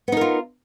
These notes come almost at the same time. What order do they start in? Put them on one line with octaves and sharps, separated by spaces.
B3 D#4 A#4 F4